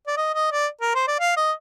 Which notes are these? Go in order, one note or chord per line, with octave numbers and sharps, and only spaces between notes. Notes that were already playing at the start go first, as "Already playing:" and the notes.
D5
D#5
D#5
D5
A#4
C5
D5
F5
D#5